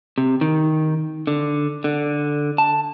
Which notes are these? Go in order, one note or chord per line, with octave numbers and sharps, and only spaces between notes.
C3
D#3
D3
D3
A5